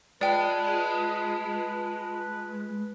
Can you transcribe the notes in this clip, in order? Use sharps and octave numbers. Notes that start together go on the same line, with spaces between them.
G#3 F4 B4 D5 G5 A5 B5